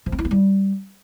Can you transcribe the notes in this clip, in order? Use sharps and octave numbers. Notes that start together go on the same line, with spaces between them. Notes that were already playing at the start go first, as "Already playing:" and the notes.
F3
C4
E4
B3
G3